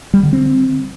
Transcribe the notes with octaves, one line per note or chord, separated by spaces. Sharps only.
G3
D3
C4